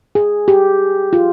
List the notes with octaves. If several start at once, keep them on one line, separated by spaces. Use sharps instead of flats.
G#4
G4
F4